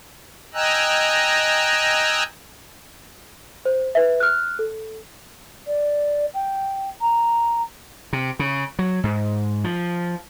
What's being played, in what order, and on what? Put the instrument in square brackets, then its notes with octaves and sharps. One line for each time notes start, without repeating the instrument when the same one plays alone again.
[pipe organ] D#5 G5 G#5 A#5 E6 F#6
[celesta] C5
B4 E5
F6 F#6
A4
[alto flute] D5
G5
A#5
[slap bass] C3
C#3
F#3
G#2
F3